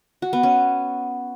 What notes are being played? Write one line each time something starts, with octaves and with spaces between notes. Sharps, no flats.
F#4
B3
C#4